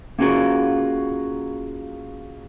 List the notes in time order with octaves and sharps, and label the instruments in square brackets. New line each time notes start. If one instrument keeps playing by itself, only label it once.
[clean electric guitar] A#3 C#4 F4 F#4 G#4 A#4